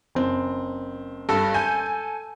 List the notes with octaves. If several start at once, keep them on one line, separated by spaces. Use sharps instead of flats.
F#1 C4
G2 A4
G#5 G6